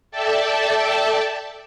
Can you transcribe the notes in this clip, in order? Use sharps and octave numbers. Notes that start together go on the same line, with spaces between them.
A4 D5 E5 G5 A5